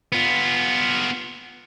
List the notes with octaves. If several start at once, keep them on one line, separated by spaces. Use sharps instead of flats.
B3 F4